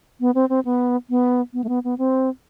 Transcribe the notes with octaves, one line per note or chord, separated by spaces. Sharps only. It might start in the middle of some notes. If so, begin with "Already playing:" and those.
B3
C4
C4
B3
B3
B3
A3
B3
B3
C4